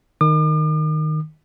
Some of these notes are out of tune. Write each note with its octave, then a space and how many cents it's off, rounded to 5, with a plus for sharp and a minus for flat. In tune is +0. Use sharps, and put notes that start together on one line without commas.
D#3 -10 D6 +45